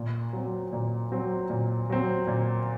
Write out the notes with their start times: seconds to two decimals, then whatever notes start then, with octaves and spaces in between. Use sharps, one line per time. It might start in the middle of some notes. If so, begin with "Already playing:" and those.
Already playing: A#2
0.33 F#3 C4
0.73 A#2
1.12 F#3 C4
1.50 A#2
1.90 F#3 C4
2.27 A#2